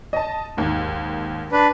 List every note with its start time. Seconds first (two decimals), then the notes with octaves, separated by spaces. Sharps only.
0.13 D#5 A5
0.57 D#2 G#2
1.52 D4 B4